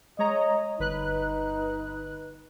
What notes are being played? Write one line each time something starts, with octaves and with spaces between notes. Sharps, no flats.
G#3 C#5 D#5 A#5
G1 D#4 B4 F#6